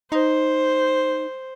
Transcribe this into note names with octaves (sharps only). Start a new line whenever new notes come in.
D#4 C5